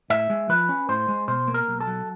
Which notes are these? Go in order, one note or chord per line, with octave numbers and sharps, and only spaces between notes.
A2 E5
G#3
F3 B4
C#4
A2 C5
G#3
B2 C5
A#3
A#4
B1
A4
F#3